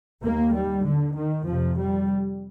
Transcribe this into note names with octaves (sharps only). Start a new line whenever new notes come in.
D#2 A#3
G3
D3
D#3
F2 C3 F3
G3